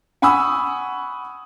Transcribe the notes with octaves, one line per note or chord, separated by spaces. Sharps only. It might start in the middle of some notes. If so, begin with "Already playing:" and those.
F#5 G#5 B5 C#6 D#6 E6